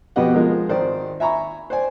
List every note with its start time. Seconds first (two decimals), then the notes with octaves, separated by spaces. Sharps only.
0.16 F2 B2 B3 G4 D#5 F#5
0.34 F3 G#3 A#4
0.69 G#1 D#3 C5 D5
1.20 E5 G#5 A#5 B5 C#6
1.70 C5 D5 G#5